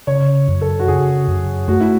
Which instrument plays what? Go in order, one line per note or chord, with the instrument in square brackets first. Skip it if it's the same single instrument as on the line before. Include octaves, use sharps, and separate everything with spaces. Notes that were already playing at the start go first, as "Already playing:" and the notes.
[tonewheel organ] C#3 [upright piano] C#5
[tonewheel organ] F#2
[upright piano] A4
F#4
[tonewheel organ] C#3 [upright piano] G#4
[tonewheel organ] F#2
[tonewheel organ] A3 [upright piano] F#4
[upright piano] E4